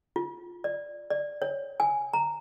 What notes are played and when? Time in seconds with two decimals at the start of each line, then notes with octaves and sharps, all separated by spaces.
0.16 F4
0.64 D5
1.11 D5
1.42 C#5
1.80 G#5
2.13 A#5